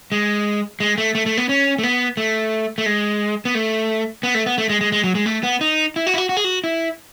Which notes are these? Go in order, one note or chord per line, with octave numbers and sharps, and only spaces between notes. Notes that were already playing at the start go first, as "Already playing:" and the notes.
G#3
G#3
A3
A3
A3
B3
C#4
A3
B3
A3
A3
G#3
B3
A3
B3
A3
B3
A3
G#3
G#3
G#3
F#3
G#3
A3
B3
D#4
E4
F#4
E4
F#4
F#4
G#4
F#4
E4